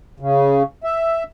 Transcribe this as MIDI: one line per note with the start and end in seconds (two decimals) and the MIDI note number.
0.20 0.63 49
0.84 1.23 76